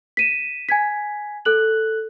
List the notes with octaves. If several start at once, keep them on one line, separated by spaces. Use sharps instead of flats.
B6 D#7 E7
G#5 G#6 B6
A4 F#6 F#7